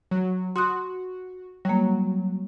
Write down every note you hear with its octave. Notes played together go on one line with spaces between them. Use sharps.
F#3
F#4 C6 D#6 F#6
F#3 G3 A#3